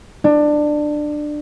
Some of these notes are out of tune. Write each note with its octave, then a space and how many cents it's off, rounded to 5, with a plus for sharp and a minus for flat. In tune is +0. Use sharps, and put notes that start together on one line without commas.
D4 +20